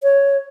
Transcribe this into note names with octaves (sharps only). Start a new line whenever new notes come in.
C#5